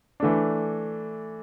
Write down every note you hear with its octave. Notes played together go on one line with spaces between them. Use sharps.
E3 A3 D4